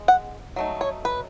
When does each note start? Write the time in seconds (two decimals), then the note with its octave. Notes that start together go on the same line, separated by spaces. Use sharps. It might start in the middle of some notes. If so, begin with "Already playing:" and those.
Already playing: G#3
0.08 F#5
0.56 F#3 A3 D#4
0.81 C#5
1.05 B4